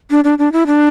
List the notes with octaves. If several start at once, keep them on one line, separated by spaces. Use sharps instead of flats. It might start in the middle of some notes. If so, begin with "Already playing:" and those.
D4
D4
D4
E4
D4